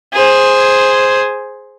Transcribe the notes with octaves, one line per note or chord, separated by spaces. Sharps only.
G#4 C5